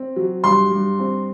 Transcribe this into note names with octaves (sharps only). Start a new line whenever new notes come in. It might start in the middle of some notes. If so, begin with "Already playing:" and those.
Already playing: C4
F#3
G2 C6
G2
C4